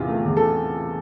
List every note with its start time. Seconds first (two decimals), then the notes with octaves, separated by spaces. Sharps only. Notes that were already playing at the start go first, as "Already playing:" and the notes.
Already playing: E2 C3 E3 F4
0.08 A3
0.25 E2
0.37 A4